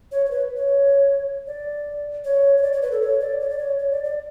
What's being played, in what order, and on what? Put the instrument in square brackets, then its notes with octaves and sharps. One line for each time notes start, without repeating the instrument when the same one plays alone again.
[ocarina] C#5
C#5
B4
C#5
D5
C#5
C#5
D5
C#5
B4
A4
C#5
D5
C#5
D5
C#5
C#5
D5
D5